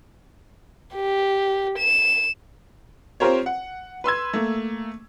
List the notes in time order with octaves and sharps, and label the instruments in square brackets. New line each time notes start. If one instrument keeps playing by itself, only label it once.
[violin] G4
E7
[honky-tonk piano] C4 F4 G4 A#4 C5 C#5
F#5
B4 C6 E6 G#6
A3 A#3